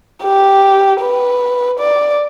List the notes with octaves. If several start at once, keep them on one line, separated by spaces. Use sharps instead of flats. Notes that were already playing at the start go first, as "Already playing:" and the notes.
G4
B4
D5